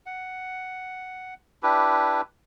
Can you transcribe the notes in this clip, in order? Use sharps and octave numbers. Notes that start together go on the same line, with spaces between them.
F#5
D4 E4 G4 B4